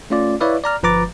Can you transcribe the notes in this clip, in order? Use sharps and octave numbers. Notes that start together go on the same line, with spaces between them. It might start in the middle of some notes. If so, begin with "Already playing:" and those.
A3 C#4 F4 D5
E4 B4 C#5 D5 E5 F5
D5 A#5 F6
G1 F3 B4 A#5 D6 A6